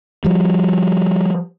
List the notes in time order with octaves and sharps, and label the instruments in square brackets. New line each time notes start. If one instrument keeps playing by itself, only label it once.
[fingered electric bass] F3 G3